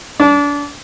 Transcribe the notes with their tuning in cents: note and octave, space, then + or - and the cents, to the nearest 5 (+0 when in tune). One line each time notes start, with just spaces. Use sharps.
D4 -30